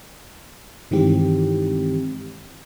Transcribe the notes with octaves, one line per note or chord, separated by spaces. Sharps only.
G2 D#3 E3 G#3 C4 G4